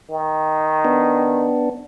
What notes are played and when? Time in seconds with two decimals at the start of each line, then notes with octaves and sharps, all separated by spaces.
0.10 D#3
0.85 B3 D4